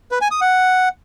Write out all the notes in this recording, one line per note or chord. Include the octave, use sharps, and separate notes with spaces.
B4
G#5
D#6
F#5